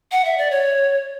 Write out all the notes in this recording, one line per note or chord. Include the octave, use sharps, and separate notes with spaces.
F#5
E5
D5
C#5